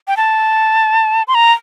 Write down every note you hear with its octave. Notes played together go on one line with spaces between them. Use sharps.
G5
A5
C6
A#5